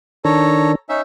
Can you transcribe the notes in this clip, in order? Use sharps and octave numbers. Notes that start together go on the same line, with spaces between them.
D#3 D4 A4 C#5 A#5
C#4 D#4 E5